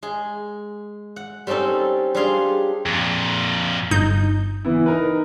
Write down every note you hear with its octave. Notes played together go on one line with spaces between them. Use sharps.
G#3 G#4
F#5
G3 C4 C#4 D#4 A4
G3 D4 F4 G#4 F5 C6
F2 A#2
G1 D#4 G6
E3 B3 E4
D#4 A#4 B4